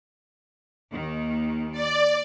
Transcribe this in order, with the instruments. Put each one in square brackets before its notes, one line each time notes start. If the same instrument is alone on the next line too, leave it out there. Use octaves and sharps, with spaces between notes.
[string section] D#2 D#3
[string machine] D5